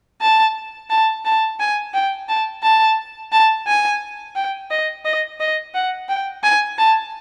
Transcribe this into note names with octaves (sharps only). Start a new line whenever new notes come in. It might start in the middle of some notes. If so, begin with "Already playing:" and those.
A5
A5
A5
G#5
G5
A5
A5
A5
G#5
G5
D#5
D#5
D#5
F#5
G5
G#5
A5